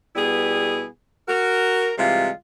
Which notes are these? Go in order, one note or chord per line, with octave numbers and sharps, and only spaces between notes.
B2 G3 B3 E4 G#4
F#4 A#4
C3 E3 G3 G#3 F4